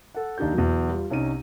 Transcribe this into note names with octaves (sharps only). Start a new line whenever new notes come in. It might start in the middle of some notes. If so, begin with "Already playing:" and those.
A4 F#5
D#2 D4 D#4 G4 G6
E2 B2 E3 F#3
G3 F4
C2 C#4 D#4 D#7